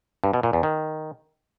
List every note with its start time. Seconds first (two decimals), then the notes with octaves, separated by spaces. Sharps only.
0.24 G2
0.33 B2
0.43 A#2
0.53 E2
0.63 D#3